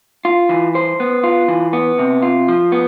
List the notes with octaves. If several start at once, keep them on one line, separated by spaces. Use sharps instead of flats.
F4
E3
C5
B3
F4
E3
B3
C3
F4
F3
B3